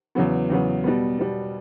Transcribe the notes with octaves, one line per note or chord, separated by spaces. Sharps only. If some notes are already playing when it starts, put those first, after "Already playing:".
E2 C#3 F#3 B3
E2 C#3 F#3 B3
B2 G3 B3
B2 G3 B3